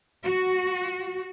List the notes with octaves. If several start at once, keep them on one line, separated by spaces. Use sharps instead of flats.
F#4